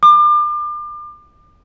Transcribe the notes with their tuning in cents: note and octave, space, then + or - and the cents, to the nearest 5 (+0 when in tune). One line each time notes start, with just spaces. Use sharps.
D6 +35